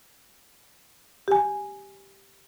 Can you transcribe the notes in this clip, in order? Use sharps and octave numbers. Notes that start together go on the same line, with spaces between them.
G4 G#5